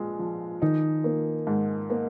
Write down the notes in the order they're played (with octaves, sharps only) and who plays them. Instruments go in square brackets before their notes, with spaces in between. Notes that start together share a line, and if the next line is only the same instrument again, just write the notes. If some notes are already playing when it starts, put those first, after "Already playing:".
Already playing: [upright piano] A#1 G#3
F3
[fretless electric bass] D#3 [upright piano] D#4
[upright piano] A#3
G#2
A#3